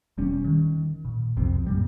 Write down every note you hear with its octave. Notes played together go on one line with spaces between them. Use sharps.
E1 G3 C#4
D#3
A#2
C2 F2 C3 C4
F#2 A#2 G3